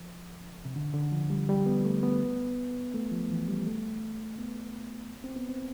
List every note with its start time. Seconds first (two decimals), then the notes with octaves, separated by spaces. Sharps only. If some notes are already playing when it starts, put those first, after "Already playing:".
Already playing: F3
0.65 C3
0.76 D3
0.94 D3
1.12 F3
1.30 G3
1.49 G3
1.66 B3
1.85 A3
2.03 B3
2.94 A3
3.11 F3
3.31 E3
3.48 G3
3.67 A3
4.38 B3
5.24 C4
5.36 B3
5.49 C4